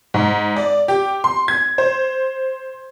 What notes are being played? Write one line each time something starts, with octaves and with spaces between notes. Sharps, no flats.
G#2
D5
G4
C6
G#6
C5